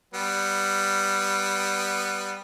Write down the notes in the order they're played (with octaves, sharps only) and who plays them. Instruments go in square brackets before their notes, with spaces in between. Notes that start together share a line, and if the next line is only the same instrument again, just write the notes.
[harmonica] G3 B3